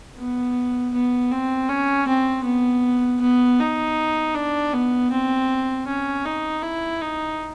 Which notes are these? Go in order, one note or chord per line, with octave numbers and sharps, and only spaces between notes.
B3
B3
C4
C#4
C4
B3
B3
D#4
D4
B3
C4
C#4
D#4
E4
D#4